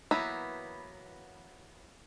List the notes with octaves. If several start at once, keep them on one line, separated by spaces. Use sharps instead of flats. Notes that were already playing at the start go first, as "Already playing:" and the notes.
E3 F#3 A#3 B3 E4